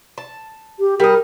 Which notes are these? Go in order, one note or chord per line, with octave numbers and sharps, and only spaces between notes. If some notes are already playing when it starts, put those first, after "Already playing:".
A5
G4
G3 A#4 D#5